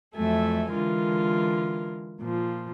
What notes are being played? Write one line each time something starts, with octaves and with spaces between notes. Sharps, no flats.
F2 F#3 A3 A4 E5 G#5
D3 E3 G#3 F4 A#4
A#2 F3